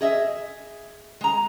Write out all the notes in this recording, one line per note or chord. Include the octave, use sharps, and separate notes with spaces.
G#4 D#5 E5
G#3 A#5